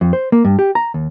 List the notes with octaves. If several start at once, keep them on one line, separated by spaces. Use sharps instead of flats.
F2
C5
A#3
G2
G4
A#5
D#2